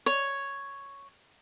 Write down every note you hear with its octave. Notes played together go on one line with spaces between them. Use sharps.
C#5